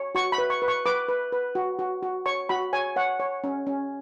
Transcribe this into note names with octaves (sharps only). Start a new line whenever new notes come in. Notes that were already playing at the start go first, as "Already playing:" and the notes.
Already playing: C#5
F#4 C#6
B5
B4
C#6
B4
C#6
B4 D6
B4
B4
F#4
F#4
F#4
C#5 C#6
F#4 B5
C#5 G#5
C#5 F#5
C#5
C#4
C#4